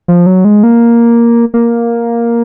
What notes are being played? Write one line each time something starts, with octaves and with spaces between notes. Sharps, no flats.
F3
F#3
G#3
A#3
A#3